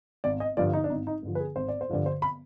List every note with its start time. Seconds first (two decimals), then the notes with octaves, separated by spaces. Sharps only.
0.24 G#1 D5
0.40 D#5
0.57 G2 D3 F3 D5
0.73 D#4
0.84 D4
0.90 G#1 D#4
1.07 D#4
1.23 G2 D3 F3
1.35 B4
1.39 G#4
1.56 G#1 C5
1.68 D5
1.81 C5
1.89 G2 D3 F3 D5
2.06 C5
2.22 B5